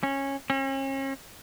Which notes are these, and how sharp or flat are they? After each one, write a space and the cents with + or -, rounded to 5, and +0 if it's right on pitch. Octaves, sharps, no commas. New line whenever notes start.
C#4 -15
C#4 -40